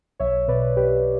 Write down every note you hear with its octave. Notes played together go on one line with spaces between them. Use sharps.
B1 C#5 E5
B2 B4 D5
B1 G4 B4